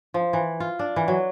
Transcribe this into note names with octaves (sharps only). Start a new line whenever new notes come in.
F3
E3
F4
D4
E3
F#3